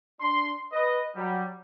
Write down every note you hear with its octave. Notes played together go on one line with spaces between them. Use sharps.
D4 C6
B4 D#5
F#3 G3